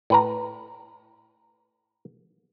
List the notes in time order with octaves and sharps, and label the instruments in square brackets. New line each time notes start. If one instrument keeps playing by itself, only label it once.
[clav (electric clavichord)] A2 B4 A#5